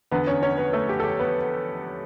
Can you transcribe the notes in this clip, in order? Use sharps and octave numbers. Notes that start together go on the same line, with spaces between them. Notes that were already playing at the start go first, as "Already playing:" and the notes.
E2 D3 B3 B4
C#4 C#5
C#4 C#5
B3 B4
A3 A4
G4
A4
G4
B3 B4